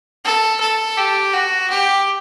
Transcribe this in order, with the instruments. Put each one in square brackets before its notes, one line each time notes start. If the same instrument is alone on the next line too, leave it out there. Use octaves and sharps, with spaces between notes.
[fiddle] A4
A4
G4
F#4
G4